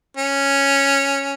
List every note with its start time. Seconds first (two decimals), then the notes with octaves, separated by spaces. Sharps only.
0.17 C#4